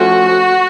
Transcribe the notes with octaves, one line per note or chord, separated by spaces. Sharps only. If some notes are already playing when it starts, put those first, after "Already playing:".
Already playing: F3 A3 C#4 F#4